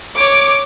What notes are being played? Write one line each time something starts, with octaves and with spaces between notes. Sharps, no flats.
C#5 D6